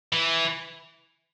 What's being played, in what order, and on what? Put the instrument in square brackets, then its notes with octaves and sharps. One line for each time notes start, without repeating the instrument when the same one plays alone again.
[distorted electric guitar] E3